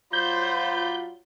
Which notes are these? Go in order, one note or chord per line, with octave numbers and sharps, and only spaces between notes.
F#3 F4 C5 D5 B5 G6